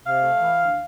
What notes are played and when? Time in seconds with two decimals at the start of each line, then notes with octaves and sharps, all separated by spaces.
0.04 C3 F5
0.22 A3
0.41 E3
0.60 D2